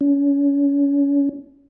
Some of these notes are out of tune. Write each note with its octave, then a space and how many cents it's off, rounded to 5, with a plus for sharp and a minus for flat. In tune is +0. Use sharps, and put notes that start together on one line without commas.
C#4 +30